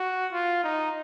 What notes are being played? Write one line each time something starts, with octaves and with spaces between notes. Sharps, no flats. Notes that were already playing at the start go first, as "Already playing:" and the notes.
Already playing: F#4
F4
D#4